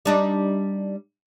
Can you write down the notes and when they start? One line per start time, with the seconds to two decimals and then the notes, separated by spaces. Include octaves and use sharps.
0.05 G3 D4 D#4